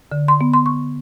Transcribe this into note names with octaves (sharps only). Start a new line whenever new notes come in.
D3
C6
B3
C6
C#6